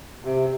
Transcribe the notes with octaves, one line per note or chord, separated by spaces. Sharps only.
C3